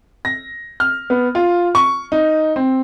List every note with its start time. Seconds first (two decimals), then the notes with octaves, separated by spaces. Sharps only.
0.25 A#6
0.80 F6
1.10 B3
1.35 F4
1.75 C#6
2.12 D#4
2.56 C4